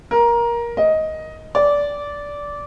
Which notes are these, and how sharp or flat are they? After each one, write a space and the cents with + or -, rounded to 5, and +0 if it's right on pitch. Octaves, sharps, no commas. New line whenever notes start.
A#4 +15
D#5 +10
D5 -15